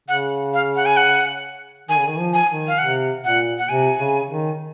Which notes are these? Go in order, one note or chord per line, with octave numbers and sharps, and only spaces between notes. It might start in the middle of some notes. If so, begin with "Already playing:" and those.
C#3 F#5
F5
F#5
G#5
F#5
D#3 G#5
C#3
D#3
F3
G#5
D#3
F5
C3 F#5
A#2 F#5
F#5
C3 G#5
C#3
D#3